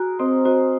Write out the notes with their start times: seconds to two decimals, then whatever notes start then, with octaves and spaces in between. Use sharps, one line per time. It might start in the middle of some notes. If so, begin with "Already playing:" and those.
Already playing: F#4 G#4 A#4
0.19 C4 C5 D#5
0.45 F#4 C5 D#5